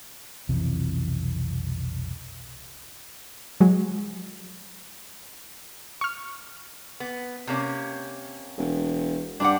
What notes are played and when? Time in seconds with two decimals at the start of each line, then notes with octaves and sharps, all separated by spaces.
0.49 B1 F2 C3 E3
3.61 F#3 G#3
6.01 C#6 F6
7.00 B3
7.47 C3 A#3 C#4
8.58 E1
9.40 G2 D4 G4 F#5